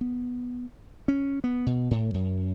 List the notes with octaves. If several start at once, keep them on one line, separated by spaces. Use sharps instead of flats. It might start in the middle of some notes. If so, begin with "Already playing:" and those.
B3
C#4
B3
B2
A2
F#2